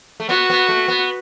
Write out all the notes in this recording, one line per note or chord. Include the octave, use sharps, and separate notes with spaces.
A3
B3 F#4
B3
A3
B3